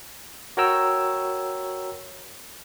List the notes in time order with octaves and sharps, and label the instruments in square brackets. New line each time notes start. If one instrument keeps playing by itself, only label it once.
[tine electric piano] F#4 A#4 C#5 G5 A#5 E6